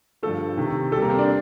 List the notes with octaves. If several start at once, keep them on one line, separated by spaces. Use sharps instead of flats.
G2 D3 F3 A3 A4
C3 D#3 A3
C3 G3 A4
A#3 A#4
C4 C5
D4 D5